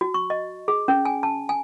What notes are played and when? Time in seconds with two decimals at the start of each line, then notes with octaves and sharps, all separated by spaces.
0.01 F#4
0.14 C#6
0.30 D#5
0.68 G#4
0.88 C#4
1.05 G#5
1.23 A5
1.49 G#5